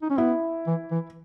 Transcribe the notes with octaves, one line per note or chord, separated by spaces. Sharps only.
D#4
C#4
B3 E4
E3
E3